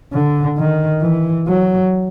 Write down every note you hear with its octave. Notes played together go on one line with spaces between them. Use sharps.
D3
D#3
E3
F#3